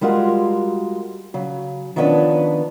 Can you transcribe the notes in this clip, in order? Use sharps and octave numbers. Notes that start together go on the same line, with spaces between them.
G3 G#3 F4 F#4 A#4
C#3 F#3
D#3 F3 B3 C#4 D4 B4